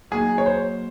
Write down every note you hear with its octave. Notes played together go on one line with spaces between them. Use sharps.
F#3 A#3 D#4 F#4 G#4
C#5
C5